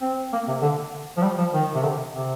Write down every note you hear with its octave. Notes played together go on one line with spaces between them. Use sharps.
C4
A#3
C3
D3
F3
G3
F3
D#3
C3
D3
C3